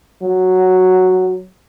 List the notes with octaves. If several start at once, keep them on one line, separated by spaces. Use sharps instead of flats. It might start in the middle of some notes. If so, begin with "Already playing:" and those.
F#3